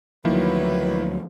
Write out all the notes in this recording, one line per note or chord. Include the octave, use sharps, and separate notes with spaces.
D2 D#3 F3 F#3 A#3 E4 B4